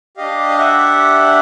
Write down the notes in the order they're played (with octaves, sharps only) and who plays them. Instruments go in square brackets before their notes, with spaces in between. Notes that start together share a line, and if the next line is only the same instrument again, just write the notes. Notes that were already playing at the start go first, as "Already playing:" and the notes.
[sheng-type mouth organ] D4 G4 D#5 F5
F5
E5 F#5